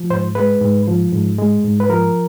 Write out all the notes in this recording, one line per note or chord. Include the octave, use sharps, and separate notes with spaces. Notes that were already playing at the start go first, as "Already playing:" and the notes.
Already playing: F3
G#2 C5
G#3 B4
G#2
F3
G#2
G#3
G#2
B4
F3 A#4